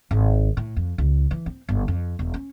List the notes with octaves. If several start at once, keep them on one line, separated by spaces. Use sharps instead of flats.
G#1
A2
F2
C#2
E3
C4
G1
F2
E1
C#4